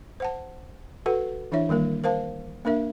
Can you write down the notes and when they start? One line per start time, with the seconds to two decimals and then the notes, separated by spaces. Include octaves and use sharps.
0.20 C5 F#5 A5
1.06 F#4 A4 B4 F#5
1.52 E3 D4 E4 C#5 E5
1.69 D#3 G3 A#3 A#4
2.04 A#4 C5 F5 A5
2.65 A#3 D4 A#4 E5